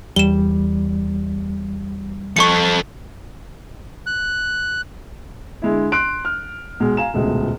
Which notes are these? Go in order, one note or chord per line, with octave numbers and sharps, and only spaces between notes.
E2 G3 E7 G7
F3 A4 C#6 C#7
F#6
D3 G#3 E4
C6 F#6 D7
F6
B1 G#3
F5 G#5 A#5 E7
D#1 C#2 B2 G#3 A3